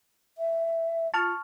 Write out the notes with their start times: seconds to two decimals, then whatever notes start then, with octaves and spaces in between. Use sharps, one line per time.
0.38 E5
1.14 F4 A5 C#6 F6